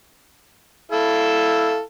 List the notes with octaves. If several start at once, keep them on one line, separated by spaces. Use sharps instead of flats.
E4 A4 F5